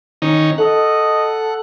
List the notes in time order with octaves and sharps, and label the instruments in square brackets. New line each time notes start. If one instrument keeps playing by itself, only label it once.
[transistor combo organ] D#3 C#4 D#4
[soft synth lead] A4 [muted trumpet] D#5 [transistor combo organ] F#5